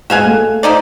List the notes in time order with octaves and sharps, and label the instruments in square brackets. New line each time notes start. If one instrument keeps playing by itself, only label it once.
[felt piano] G#3 F#6 [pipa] F#4 F5 G#5
[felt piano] A3
[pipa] F3 D#4 D5